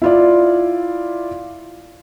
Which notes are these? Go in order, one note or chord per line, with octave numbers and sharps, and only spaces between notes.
E4 F4 D5